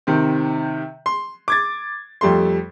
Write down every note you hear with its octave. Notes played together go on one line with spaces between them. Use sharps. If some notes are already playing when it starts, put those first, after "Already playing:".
C3 D#3 C4
C6
D6 G#6 A6
F2 G3 A3 C6